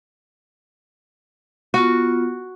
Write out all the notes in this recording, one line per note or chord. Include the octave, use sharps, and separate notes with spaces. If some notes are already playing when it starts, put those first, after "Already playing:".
B3 F4 F#4